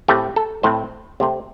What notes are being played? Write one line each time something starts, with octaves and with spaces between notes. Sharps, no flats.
A2 A3 C4 G4
A4
A2 A3 C4 C5
C3 A3 C4